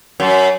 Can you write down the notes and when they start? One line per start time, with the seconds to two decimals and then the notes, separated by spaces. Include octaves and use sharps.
0.20 F#2